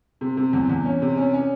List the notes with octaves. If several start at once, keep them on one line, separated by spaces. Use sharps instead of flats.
C3
C3
E2
E2
C#4
C3
C#4
C#4